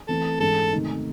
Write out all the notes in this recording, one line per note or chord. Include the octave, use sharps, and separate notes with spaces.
E3 A3 C4 A4
G#2 E3 G#3 C#4 A4
C3 D#3 A3 D#4